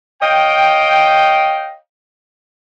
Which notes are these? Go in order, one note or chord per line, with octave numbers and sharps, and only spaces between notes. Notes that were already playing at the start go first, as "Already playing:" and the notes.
C#5 D#5 F5 G5